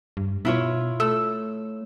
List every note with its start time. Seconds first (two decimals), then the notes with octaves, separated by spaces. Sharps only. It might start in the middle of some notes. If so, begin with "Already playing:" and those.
0.17 G2
0.45 B2 E4 F4 C#5
1.00 A3 E6